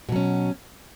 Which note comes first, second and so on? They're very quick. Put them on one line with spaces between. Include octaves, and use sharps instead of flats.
B2 F#3 C#4